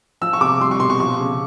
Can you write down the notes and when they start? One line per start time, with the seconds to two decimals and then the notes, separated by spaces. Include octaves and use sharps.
0.21 F3 E6
0.33 C#6
0.41 C3 D6
0.60 G3 C6
0.71 C#6
0.80 B2 C6
0.90 C#6
1.00 F3 C#6
1.20 C#3